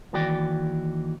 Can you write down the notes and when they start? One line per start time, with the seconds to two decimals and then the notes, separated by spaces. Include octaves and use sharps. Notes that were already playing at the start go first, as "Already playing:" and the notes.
0.13 D#2 D#3 E3 F#4 D5 G5